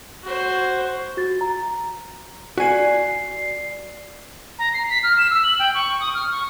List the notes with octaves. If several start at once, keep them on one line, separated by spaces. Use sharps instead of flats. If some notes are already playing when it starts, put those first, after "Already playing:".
F#4 C5
F#4 A6
A#5
F#4 D5 G#5 C7
A#5
C7
B6
F6
E7
E6
F#7
G5
C#6
D#6
F6
C#6